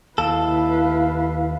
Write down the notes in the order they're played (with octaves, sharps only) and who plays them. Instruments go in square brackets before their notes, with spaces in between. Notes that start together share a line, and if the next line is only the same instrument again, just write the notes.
[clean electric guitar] D#2 A4 [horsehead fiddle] E4 B4 [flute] F5